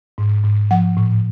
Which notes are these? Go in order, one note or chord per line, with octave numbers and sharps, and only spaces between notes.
G#2
G#2
F3 F#5
A2